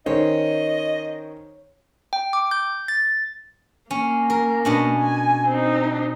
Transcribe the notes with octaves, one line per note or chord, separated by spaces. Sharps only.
D#3 C#4 C5 C#5 D#5
G5
D6
G6
A6
A#3 C#4
A#4
B2 C#4 D4
G#5
C4 D#4